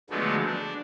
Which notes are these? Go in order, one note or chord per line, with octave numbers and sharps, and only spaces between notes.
D3 F3 F#3 G#3 A3 B3
D4